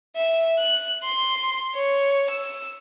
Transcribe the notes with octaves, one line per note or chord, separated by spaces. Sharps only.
E5
F#6
C6
C#5
E6